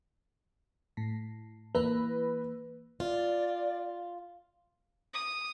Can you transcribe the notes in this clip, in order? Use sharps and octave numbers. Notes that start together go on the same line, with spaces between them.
A2
E3 A#3 B4
F4 D5
D#6